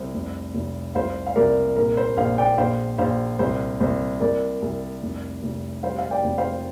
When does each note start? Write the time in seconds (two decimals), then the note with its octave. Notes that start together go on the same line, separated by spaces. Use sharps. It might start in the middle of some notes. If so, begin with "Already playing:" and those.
Already playing: C2 C5
0.14 F1
0.55 F1
0.95 C2 C5 F5
1.26 F5
1.36 C2 A#4 D5
1.76 A#1 A#4
1.97 C5
2.17 A#1 C5 F5
2.38 D5 G5
2.58 A#1 C5 F5
2.98 A#1 C5 F5
3.39 C2 C5
3.80 C2 C5
4.20 C2 A#4 D5
4.62 C2
5.03 F1
5.43 F1
5.83 G3 C5 F5
5.99 F5
6.11 D5 G5
6.24 F1
6.38 C5 F5